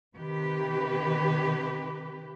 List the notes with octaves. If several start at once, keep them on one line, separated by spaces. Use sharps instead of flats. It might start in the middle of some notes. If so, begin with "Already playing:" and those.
C3 D#3 G4 B4